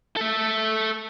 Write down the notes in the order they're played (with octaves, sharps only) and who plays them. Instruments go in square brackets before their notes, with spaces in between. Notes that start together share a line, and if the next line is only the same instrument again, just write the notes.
[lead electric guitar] A4 E5